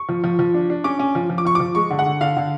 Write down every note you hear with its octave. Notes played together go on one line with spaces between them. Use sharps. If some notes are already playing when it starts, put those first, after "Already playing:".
Already playing: C#6
F3
F3
F3
D4
D4
C#4 D6
C#4
F3
F3
D6
F3 C#6
F3 D6
G#3 C#6
D3
F#5
D3
D3 F5
D3